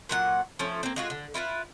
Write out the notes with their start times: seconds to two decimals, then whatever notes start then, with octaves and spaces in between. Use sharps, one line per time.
0.09 A#2 F#3 F#5
0.59 F3 A3 C#4
0.83 A#3 C4
0.96 G#3 F4 F#4
1.10 D3
1.34 E4 F4 A4 B4